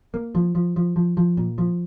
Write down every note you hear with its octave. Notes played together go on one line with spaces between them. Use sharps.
A#3
F3
F3
F3
F3
F3
A#2
F3